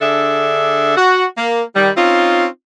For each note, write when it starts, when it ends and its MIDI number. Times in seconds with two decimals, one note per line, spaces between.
0.01 0.95 50
0.01 0.95 62
0.01 0.95 68
0.01 0.95 69
0.01 0.95 76
0.96 1.24 66
1.36 1.62 58
1.75 1.90 51
1.75 1.90 55
1.96 2.46 60
1.96 2.46 61
1.96 2.46 63
1.96 2.46 65